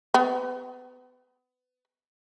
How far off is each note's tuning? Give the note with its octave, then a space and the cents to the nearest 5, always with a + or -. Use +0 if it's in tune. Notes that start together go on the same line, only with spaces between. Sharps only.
B3 +30